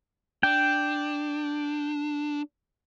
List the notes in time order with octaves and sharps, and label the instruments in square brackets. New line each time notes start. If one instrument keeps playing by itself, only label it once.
[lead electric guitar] D4 [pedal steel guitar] G5